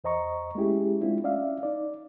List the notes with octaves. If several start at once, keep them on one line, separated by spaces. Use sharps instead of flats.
E2 C5 D#5 A#5 C#6
G#3 A3 C#4 E4 G4 G#4
G#3 A3 C4 D4 E4 F4
C#4 D5 E5 F5
D#4 D5